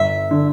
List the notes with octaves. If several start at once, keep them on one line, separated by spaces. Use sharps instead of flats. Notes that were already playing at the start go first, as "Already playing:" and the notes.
Already playing: G1 E5
D3